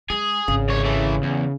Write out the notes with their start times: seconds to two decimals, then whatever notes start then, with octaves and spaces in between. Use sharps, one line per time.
0.10 G#3 G#4
0.48 G#1 C#3
0.69 C2 C#5
0.85 E3 A3
1.23 E2